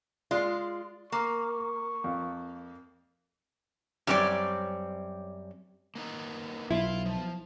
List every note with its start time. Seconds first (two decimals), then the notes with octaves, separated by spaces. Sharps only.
0.31 G#3 F4 D5
1.12 A#3 C#6
2.04 F2
4.07 F#2 G3 C4 C#4 D5
5.95 A#3 B3 D#4
6.71 B1 E4 F4 F5
7.05 F3